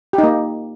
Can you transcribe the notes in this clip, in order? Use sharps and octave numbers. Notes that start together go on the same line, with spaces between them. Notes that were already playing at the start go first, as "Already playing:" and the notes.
G4
D#4
A#3